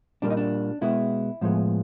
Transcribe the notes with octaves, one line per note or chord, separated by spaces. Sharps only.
A#2 G3 A#3 D4
D#4
D4
B2 G#3 B3 E4
A2 F3 G#3 B3